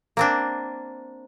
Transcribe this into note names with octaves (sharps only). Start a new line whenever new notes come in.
A#3 C4 D4